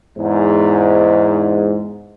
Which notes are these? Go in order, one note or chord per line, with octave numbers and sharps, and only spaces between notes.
E2 G#2